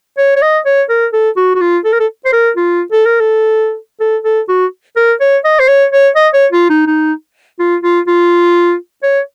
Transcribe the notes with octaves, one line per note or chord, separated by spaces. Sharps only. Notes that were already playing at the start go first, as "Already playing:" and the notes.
C#5
C#5
D#5
C#5
A#4
A4
F#4
F#4
F4
A4
A#4
A4
C5
A#4
F4
A4
A#4
A4
A4
A4
F#4
A#4
C#5
D#5
C5
C#5
C#5
D#5
C#5
F4
D#4
D#4
F4
F4
F4
C#5